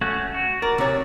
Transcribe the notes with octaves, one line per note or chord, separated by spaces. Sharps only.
A3 C#4 F#4
F#4
A#4 D5
C3 C#5